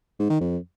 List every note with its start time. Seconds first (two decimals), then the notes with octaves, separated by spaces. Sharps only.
0.19 G#2
0.30 D#3
0.41 F2